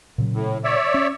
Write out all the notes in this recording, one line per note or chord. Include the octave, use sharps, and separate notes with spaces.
A#2 C#3 F#3
A2
C#5 D5 E5
C#4